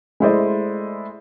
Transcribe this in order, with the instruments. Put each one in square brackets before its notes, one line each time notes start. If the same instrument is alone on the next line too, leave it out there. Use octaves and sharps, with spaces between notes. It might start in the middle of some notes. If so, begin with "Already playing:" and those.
[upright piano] G#3 A3 E4 C5 D5 D#5